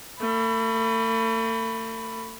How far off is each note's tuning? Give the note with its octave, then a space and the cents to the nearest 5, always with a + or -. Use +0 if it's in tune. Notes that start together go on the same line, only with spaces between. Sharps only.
A3 +40 B5 +0